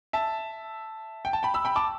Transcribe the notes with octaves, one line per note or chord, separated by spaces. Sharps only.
E5 A5
G5
A5
G5 B5
B5 E6
G5 B5
A5 D6